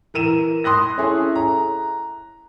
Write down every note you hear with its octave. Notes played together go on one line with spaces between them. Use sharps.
E3 A#4 D#7 E7
C6 D#6 F#6 A#6
C#4 E4 G#4 A4
A#5